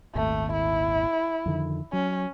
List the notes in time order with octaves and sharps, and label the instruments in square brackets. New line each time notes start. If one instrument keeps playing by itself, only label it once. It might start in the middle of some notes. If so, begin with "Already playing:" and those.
[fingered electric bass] D#1 G#1 D#2 [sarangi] A3
[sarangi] E4
[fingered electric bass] F2 D3 D#3
[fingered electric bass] F#3 [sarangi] C#4